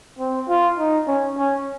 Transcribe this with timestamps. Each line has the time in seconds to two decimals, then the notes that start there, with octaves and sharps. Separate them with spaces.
0.19 C4
0.49 F4
0.78 D#4
1.08 C#4
1.38 C#4